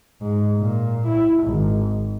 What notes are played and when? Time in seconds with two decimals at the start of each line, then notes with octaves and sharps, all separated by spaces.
0.21 G#2
0.58 A#2
1.06 E4
1.44 G#1